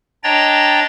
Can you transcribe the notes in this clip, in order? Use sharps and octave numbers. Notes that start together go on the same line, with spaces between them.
D4 C#5 D#5 G5 A#5 A6